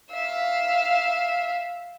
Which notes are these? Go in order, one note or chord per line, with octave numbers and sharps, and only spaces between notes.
E5 F5